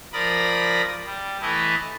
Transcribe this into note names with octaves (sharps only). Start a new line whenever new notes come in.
F3 A#4 D5 B5 D#6 A#6
G3
E3 A3 E4 A4 D#5